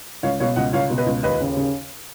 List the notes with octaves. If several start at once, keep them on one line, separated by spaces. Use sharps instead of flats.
C#2 C#5 F5
B2 C#5 F5
C#2 D#5 F#5
C#2 C#5 F5
B2
B4 D#5
C#2
D#2 B4 D#5
C#3
C#3